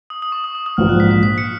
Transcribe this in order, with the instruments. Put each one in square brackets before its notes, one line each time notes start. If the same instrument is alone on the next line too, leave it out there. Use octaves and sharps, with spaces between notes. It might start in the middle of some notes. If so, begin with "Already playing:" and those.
[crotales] D#6
D#6
C#6
D#6
D#6
D#6
[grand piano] A#1 G#2 F3 [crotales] F6
[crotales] F#6
B6
B6
B6
C#7